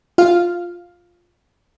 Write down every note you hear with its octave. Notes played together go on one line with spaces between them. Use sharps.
F4 F5